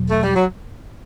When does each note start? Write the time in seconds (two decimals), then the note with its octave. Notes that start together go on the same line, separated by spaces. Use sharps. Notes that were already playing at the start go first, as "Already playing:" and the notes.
Already playing: E2 B2 F#3
0.10 A3
0.23 G3
0.35 F#3